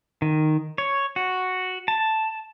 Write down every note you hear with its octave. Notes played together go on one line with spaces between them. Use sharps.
D#3
C#5
F#4
A5